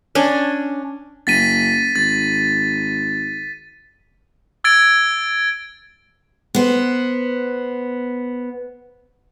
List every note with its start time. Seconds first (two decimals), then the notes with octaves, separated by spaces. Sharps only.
0.15 C#4 D4 G#5
1.27 F#1 A6 B6 D#7
1.96 G#1 A6
4.64 E6 G#6 A6 D7
6.55 B3 C5